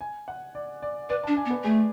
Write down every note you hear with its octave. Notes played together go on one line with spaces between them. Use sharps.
G#5
F#5
D5
D5
B4 D5
D4 A5
G#5
B3
B4
A3 G#4